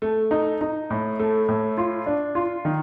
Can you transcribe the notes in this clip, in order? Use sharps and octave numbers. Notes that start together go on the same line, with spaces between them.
A3
D#4
D#4
A2
A3
A2
F4
D4
F4
D#3